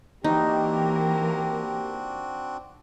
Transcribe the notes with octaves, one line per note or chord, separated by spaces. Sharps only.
E3 A#3 C4 D4 D#4 F#4 G4 A#4